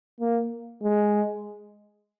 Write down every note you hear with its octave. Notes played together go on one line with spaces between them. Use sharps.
A#3
G#3